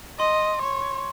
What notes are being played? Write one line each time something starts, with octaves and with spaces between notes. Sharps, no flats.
D#5 C6
C#5